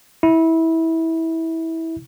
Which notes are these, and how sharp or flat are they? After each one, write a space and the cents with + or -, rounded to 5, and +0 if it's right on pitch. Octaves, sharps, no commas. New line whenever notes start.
E4 -20